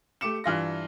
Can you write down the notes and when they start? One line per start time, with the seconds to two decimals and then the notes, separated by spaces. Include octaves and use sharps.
0.21 A3 G4 D6 C#7 E7
0.44 G2 E3 F4 A#6